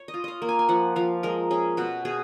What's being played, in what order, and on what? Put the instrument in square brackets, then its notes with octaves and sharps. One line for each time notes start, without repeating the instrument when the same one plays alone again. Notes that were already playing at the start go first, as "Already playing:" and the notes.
Already playing: [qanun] C#5
D#5
F4
D#5 F5
A#3
G#5
G#5
F3 F#5
F3 F5
G#3 A#4
C#4 G#4
B2 F#4
B2 G#4